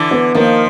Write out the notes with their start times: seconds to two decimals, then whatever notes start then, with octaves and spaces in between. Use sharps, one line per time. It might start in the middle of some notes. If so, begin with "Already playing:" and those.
Already playing: D3 E3
0.11 B3
0.35 D#3 F3 A#3